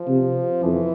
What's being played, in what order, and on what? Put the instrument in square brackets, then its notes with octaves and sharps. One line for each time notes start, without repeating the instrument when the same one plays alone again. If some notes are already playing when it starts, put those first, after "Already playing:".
Already playing: [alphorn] F3
[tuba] C3
[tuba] F2 [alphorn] E3